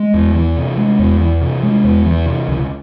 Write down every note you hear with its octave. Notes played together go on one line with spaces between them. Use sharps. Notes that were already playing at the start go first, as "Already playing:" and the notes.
Already playing: G#3
E2
E3
C3
G#3
E2
E3
C3
G#3
E2
E3
C3
C#2